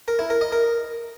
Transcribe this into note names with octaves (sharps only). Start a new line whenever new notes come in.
A#4
E4
A#4
D#5
A#4